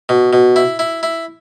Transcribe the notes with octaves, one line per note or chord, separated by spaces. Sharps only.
B2
B2
E4
E4
E4